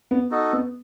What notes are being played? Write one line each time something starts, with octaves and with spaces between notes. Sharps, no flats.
B3
D#4 F#4 A4 D#5
B3